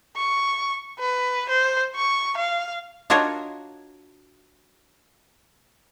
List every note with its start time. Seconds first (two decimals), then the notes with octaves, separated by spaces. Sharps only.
0.16 C#6
0.99 B4
1.50 C5
1.96 C#6
2.38 F5
3.10 D4 F4 F#4 A#4 C#5 D#5